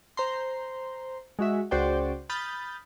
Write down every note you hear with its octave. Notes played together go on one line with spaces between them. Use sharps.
C5 A#5 C6
G#3 F#4 E5
C#2 F#4 C5 D5 G5
B5 D#6 F6 G6 A6